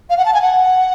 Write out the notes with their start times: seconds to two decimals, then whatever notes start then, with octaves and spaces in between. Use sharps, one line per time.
0.10 F5
0.18 F#5
0.25 A5
0.34 G#5
0.42 F#5